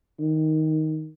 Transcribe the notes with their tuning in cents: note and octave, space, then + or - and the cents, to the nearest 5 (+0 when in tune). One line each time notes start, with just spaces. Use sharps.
D#3 +10